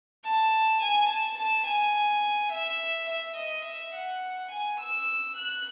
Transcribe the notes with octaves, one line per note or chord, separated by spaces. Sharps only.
A5
G#5
A5
A5
G#5
E5
E5
D#5
E5
F#5
G#5
E6
F#6